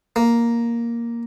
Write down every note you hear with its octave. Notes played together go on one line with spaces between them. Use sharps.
A#3